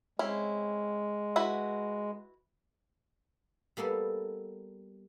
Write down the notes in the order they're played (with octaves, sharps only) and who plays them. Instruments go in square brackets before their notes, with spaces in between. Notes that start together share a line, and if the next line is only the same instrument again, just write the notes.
[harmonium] G#3 [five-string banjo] C4 C#4 E4
[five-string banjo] E4 F#4 B4
[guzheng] G3 A#3 B3 A4